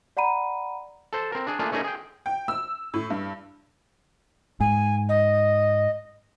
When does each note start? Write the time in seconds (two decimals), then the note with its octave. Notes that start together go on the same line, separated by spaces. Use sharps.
0.17 D5 F#5 A#5 B5 D#7
1.13 A4 C5 A5
1.32 C4 A#4
1.47 D4 G#4
1.59 A3 A#3 D4 F4 G#4
1.72 A3 C#4 D#4 G#4 A#4 D#5
1.84 G#4 G5
2.26 G5
2.48 E6
2.94 A2
3.10 G2
4.60 G#2 G#5
5.09 D#5